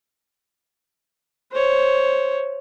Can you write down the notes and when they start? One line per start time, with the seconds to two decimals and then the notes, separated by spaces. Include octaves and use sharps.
1.53 C5 C#5